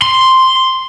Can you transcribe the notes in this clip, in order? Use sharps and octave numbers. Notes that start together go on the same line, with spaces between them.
C6